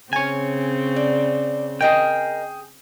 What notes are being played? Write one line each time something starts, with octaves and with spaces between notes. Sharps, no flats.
C#3 C4 C#5 G#5
D5
G#4 A#4 D#5 G5